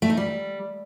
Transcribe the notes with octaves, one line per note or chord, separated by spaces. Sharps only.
A3
D#4
G3